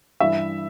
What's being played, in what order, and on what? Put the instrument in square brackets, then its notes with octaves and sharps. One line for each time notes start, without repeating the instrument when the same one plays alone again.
[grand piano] G2 E3 G3 E5